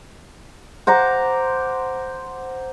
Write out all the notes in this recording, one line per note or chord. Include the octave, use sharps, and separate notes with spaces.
C5 F#5 A#5 D6